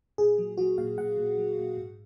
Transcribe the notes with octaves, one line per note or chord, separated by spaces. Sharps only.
A#2 G#4
F#3
F#3 F#4
A#2 F5
A#2 F#5
A#2
F#3
A#2
G#2